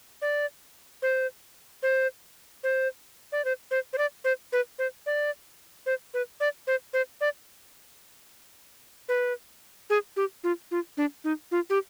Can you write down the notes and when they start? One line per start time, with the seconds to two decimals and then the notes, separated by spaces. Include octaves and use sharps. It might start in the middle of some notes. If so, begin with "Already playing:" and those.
0.22 D5
1.02 C5
1.83 C5
2.63 C5
3.32 D5
3.45 C5
3.71 C5
3.93 C5
3.98 D5
4.24 C5
4.52 B4
4.79 C5
5.06 D5
5.86 C5
6.14 B4
6.40 D5
6.67 C5
6.93 C5
7.21 D5
9.09 B4
9.90 G#4
10.16 G4
10.44 F4
10.71 F4
10.97 D4
11.24 D#4
11.51 F4
11.70 G4